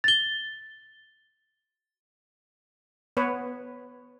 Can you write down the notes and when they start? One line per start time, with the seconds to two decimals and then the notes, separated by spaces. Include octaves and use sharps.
0.04 A6 G7
3.17 B3 B4 C#5